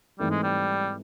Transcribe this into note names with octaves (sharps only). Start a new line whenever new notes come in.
G#2 E3 G3 A3 C4
G#3
G3